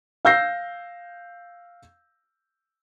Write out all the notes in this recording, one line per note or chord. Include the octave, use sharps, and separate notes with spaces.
F5 E6 G6 A#6 C7